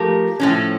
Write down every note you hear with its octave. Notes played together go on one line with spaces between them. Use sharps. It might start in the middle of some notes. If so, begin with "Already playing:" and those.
Already playing: F3 A3 G4 A#4
A2 F3 C#4